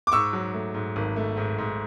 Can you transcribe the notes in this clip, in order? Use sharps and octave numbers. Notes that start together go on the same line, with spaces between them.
D6
G#2 C#6 E6
F#3
A3
G#2
G#1
A3
G#2
G#2